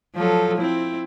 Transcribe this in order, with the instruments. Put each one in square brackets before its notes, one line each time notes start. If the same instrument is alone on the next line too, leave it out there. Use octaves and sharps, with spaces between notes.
[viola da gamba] F3 F#3 A4
C4 E4